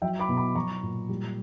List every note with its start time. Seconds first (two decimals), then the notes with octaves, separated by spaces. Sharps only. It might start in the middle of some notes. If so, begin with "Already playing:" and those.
0.02 F#3 E5 G5
0.19 B5 D6
0.29 B2
0.37 B5 D6
0.55 F#3 A#5 C#6
0.83 A#2
1.09 G3